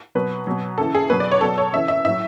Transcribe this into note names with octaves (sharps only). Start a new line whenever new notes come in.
B2 F#3 B4
B2 F#3
C#3 E3 A4
G#4
B2 F#3 B4
D5
C#5
B2 F#3 A4
C#5
C#3 E3 E5
E5
A2 F#3 E5